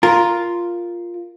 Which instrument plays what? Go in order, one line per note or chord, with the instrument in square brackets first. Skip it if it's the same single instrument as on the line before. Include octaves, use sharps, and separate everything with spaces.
[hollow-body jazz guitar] F4 A#4